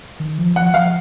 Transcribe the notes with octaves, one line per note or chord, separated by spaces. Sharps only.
D#3
F3
F3 F#5
F3 F5
F3